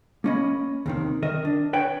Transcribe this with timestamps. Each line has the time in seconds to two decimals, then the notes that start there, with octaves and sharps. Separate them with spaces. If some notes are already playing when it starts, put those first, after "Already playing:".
0.24 A#3 C#4 D#5 B5
0.86 D#2 C3 D#3
1.22 D#3 A#4 D#5 E5
1.45 D4
1.73 B4 C#5 G5